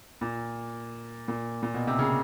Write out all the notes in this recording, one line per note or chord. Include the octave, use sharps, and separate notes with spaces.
A#2
A#2
A#2
B2
C3
C#3